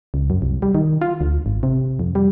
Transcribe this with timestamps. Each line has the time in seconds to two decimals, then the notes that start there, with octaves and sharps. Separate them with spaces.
0.14 C#2
0.30 F#2
0.42 C2
0.62 G3
0.75 D#3
1.01 F4
1.21 D2
1.46 G#1
1.63 C3
1.99 F2
2.15 G3